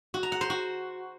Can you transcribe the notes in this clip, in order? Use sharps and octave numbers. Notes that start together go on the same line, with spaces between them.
F#4
A#5
F#5
C5
F#4